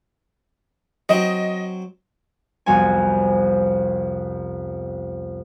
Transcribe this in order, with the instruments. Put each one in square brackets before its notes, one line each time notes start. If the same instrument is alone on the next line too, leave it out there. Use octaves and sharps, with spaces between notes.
[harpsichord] F#3 C4 [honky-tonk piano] D#5
[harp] C2 F2 G3 B3 F#4 G#5